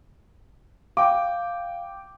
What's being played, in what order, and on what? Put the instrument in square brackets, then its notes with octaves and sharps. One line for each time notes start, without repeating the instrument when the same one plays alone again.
[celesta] F5 [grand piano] G5 D6